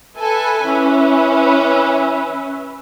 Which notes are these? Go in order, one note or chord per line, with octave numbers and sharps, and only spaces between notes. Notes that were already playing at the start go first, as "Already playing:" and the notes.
A4 B4 E5 G#5
E3 C#4